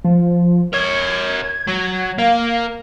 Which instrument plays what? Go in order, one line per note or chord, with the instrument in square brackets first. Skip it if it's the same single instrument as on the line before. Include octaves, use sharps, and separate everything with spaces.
[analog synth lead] F3
[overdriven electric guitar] A#4 C#5 [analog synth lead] G#6
[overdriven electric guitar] F#3
[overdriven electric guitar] A#3 [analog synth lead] F5